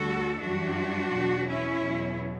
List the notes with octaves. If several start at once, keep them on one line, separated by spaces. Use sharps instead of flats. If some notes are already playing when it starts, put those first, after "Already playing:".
Already playing: D2 D3 G3 F#4 A4
F#2 E3 G3 D4 F#4
E2 B2 F#3
C#4 E4
E2 B2 F#3